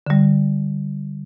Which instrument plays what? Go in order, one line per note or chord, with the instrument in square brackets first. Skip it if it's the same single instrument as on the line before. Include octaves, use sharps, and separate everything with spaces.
[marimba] D3 G3